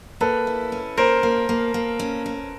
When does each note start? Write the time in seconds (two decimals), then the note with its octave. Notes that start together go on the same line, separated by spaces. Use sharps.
0.21 A#3 A4 B4
0.47 E4
0.72 C#4
0.97 A#3 A#4 C5
1.23 A#3
1.49 A#3
1.74 A#3
1.99 C#4
2.26 C#4